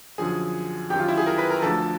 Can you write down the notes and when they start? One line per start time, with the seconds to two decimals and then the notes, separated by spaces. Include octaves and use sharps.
0.18 F#2 D3 F3 G#4 G#5
0.90 F#2 D#3 G4 G5
0.99 F4 F5
1.08 E4 E5
1.17 G#4 G#5
1.26 A#4 A#5
1.38 B4 B5
1.50 A#4 A#5
1.62 D2 D3 F3 A4 A5